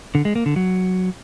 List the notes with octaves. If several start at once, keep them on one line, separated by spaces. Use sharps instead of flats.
D3
G#3
A#3
D3
F#3